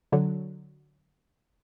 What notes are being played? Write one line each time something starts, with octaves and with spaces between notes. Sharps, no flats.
D3 F#3